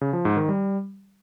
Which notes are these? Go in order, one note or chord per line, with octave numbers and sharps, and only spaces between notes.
C#3
F3
G#2
D#3
G3